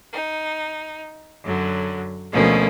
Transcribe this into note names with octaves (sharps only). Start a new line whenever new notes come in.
D#4
F#2 D3 F#3
D2 B2 F3 A3 A#3 C#4